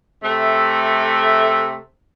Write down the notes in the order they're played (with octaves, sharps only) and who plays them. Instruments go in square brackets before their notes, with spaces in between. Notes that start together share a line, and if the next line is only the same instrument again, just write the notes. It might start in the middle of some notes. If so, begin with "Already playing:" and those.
[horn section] C3 A3